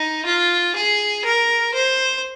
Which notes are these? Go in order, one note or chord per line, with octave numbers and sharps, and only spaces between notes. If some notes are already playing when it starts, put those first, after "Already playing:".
Already playing: D#4
F4
G#4
A#4
C5